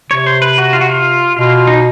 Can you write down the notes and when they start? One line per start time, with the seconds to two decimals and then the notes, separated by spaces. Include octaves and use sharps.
0.10 C3 C#5
0.26 C5
0.42 B4
0.58 F#4
0.73 F4
0.81 F#4
0.89 F4
1.37 B2 F4
1.67 D#4